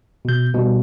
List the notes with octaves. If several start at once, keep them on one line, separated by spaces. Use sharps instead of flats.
B2 G6
B2 G3